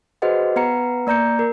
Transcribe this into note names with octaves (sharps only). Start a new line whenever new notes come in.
F#4 G#4 B4 C5 D#5 F#5
B3 B4 F#5 A#5 C#7
A#3 D5 A#5 G6 C#7
A#4